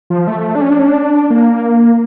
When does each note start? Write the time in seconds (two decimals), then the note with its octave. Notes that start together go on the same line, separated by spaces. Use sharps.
0.10 F3
0.28 A3
0.55 D4
0.61 C#4
0.70 D4
0.79 C#4
0.87 D4
1.30 A#3